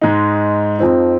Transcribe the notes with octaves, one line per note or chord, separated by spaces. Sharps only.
G#2 G#3 D#4
F2 F3 C4 D#4